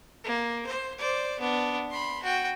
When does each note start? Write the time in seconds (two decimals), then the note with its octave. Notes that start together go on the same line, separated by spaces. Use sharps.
0.24 A#3
0.67 C5
0.98 C5 D5
1.39 B3 D4
1.90 B5 C6
2.23 F#4 G5